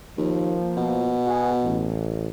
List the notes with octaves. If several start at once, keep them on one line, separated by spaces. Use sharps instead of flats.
D#2 F3 A#3
B2
B3 F#4 G#4
A1